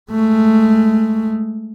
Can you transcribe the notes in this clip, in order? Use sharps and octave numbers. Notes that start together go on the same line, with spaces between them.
G#3 A3